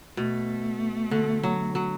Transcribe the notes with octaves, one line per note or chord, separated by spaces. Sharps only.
B2 A3
D3
F#3
F#3